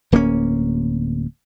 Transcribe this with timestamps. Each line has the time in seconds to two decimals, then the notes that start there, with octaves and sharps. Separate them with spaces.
0.12 D1 A#3 B3 C#4